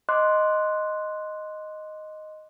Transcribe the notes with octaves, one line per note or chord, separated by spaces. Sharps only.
D#5 C6 D6 F#6